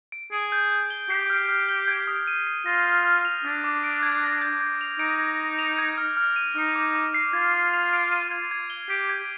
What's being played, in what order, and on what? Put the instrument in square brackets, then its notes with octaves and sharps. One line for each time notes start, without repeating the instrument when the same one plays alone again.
[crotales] D7
[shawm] G#4 [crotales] D7
[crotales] G6
G6
G7
[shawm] G4 [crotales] C7
[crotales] F6
F6
G7
G#6
D#6
D#7
C7
[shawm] F4 [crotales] A#6
[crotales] F6
F6
F7
[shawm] D4 [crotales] F6
[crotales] D6
D7
G#6
A#6
G6
G6
F7
[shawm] D#4 [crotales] D7
[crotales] G#6
G#6
F7
G#6
F6
F6
D#7
[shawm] D#4 [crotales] F6
[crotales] D6
D6
C7
[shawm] F4 [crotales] G#6
[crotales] D6
F7
D7
D#7
G#6
G#6
G7
[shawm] G4 [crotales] D7
[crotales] G#6